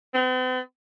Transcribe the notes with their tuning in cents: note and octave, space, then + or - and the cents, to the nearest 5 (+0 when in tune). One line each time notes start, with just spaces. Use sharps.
C4 -45